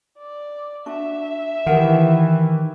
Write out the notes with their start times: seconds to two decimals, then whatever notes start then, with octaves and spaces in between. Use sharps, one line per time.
0.19 D5
0.86 D4 F#4 E5
1.66 D#3 E3 G4 A#4 F#5